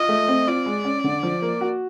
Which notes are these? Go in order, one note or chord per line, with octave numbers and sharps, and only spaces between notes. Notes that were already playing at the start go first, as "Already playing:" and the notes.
Already playing: F4 D#5
A3
C4
F4 D5
G#3
C#4
D3
F3
A#3
F#4